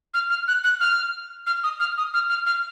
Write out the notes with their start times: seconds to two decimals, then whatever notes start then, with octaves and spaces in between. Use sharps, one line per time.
0.14 F6
0.30 F6
0.48 F#6
0.64 F#6
0.80 F6
1.46 F6
1.63 D#6
1.80 F6
1.98 D#6
2.14 F6
2.30 F6
2.46 F6